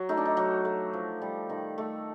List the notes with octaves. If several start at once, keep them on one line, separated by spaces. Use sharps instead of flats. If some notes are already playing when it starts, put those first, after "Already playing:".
Already playing: F#3
A3 D#4
D4
D#4
F#3
A3
F3
G3
D#3
A3